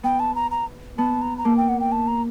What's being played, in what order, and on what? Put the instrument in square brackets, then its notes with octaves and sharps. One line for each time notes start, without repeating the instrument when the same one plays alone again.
[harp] B3 [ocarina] G5
[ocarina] A5
A#5
A#5
[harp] B3 [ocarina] A5
[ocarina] A#5
A#5
[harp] A#3 [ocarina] A5
[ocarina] G5
F#5
G5
A5
A#5